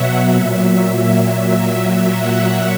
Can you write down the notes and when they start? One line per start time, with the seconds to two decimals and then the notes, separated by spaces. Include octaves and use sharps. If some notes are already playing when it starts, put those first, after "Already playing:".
Already playing: B2 F#3 E5 F#5
0.28 A#2 F#3 E5
1.47 A#2 F#3
2.07 F#5